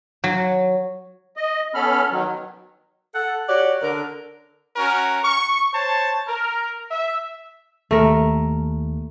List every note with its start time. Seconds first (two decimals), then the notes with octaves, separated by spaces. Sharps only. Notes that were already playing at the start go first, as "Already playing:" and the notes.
0.24 F#3
1.37 D#5
1.75 B3 C#4 A4 B5 F6
2.11 B2 D#3 F#3
3.15 A4 F#5
3.48 F#4 G4 C#5 D5
3.82 D3 A#4
4.76 C#4 F#4 A#4
5.23 C#6
5.73 C5 C#5 A5
6.27 A#4
6.91 E5
7.91 D#2 A3 A#4